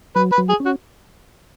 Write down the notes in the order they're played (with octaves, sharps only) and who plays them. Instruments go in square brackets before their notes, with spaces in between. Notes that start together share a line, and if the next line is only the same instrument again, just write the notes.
[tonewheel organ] F#3 [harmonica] B4
[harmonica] B4
[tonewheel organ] F#3
[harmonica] G#4
[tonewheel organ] C#4
[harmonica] F#4